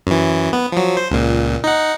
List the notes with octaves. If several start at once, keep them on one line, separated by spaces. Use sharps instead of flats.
F#2 E3
B3
F3 F#3
C5
C#2 A#2
D#4 F#5